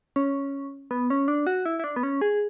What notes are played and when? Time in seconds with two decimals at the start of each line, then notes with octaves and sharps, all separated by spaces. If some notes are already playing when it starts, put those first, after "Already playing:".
0.16 C#4
0.91 B3
1.10 C#4
1.28 D4
1.47 F#4
1.66 E4
1.79 E4
1.84 D4
1.96 B3
2.03 C#4
2.21 G#4